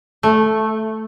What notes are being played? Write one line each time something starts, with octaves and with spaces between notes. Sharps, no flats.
A3